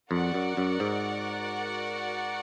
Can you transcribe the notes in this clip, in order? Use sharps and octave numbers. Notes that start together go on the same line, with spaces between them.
F2 F#4 A#4 D5 F#5
F#2
F#2
G#2